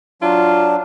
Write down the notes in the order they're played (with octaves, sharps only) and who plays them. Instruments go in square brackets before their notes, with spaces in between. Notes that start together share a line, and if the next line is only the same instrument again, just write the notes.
[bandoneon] F#3 D4 [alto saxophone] F4